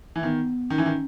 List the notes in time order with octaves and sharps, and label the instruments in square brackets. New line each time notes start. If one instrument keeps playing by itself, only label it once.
[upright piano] E3
[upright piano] D#3 [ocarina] B3
[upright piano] D#3 [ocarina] C#4
[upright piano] E3
D#3